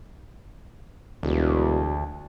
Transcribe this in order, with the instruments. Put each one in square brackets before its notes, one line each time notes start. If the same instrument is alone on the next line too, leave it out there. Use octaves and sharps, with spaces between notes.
[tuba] E1 [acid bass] D2